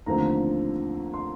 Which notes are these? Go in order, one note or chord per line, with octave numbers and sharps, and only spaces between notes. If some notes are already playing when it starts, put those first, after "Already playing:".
D#2 D3 F3 A3 C4 A#5
C6